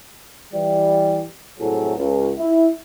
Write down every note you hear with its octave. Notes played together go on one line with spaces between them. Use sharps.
E3 G3
C2 A2 F#3 G#4 A4
C#2
E4